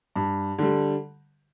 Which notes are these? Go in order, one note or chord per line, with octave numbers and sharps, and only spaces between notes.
G2
D3 G3